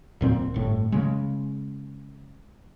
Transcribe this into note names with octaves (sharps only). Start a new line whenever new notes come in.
D1 A#2 C4
G1 A2
C#3 G#3